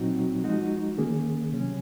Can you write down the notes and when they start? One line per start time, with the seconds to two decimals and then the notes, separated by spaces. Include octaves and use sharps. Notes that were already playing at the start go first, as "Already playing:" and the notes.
Already playing: A#2 F#3 C4 D#4 F#4
0.44 F3 G#3 D#4 F#4
0.98 D#3 A#3 C#4 G#4
1.52 C3 F#3 C#4